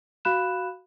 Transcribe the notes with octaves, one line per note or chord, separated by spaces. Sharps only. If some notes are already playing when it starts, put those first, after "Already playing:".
F#4 F5 B5 F#6 E7